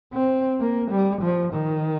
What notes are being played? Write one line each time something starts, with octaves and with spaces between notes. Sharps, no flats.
C4
A#3
G3
F3
D#3